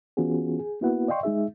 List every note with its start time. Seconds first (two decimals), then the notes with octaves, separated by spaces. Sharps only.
0.17 E3 B3 C#4 F4 F#4 G#4
0.59 G#4
0.81 A#3 B3 E4 F#4 B4 F#5
1.08 D5 D#5 F5 G5 C6 C#6
1.23 G#3 D#4 G#4 E5